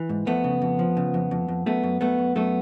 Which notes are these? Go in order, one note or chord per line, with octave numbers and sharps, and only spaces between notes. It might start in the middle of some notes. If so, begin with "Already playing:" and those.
Already playing: E3
G#2
F2 A3 B3
C#3
F2
F3
C#3
F2
F2
F2
F#2 A3 B3
F#2
F#2 A3 B3
F#2
F#2 A3 B3